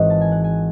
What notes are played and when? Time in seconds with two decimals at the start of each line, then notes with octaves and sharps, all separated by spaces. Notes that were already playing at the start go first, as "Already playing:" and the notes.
Already playing: G#1 G#2 E3 G#3 D#5 F#5
0.10 A5
0.21 G#5
0.32 F#5
0.44 G#5